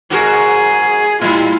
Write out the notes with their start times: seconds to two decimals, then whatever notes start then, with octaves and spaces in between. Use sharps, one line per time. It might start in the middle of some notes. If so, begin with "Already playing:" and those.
0.10 G#2 F#4 G#4 A#4
1.21 A2 G3 E4 F4